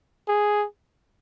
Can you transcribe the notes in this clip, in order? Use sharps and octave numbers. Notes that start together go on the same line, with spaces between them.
G#4